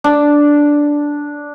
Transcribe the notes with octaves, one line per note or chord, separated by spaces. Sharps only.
D4